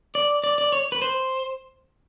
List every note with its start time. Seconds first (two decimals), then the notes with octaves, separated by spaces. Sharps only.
0.15 D5
0.44 D5
0.58 D5
0.72 C#5
0.92 B4
1.02 C5